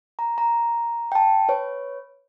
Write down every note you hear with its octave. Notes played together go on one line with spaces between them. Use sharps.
A#5
A#5
G5 A5
B4 C#5